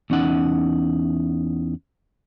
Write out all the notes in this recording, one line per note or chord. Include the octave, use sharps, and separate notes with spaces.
E2 C#4 D#4 F#5